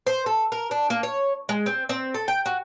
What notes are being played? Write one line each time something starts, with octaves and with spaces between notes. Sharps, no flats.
C5
A4
A#4
D4
A#3
C#5
G#3
C4
C4
A4
G5
F#4